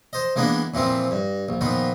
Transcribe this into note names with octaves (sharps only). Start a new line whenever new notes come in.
C5 D#5
E3 G#3 A#3 B3 D4
A#2 E3 F3 C4
G2
A#1
A#2 D#3 F3 B3